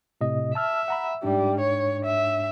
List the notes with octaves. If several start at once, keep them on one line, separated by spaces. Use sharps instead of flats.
A2 C3 D#5
E5 A5 E6 F6
F#5 A#5 B5
G#2 G3 D4
C#5
E5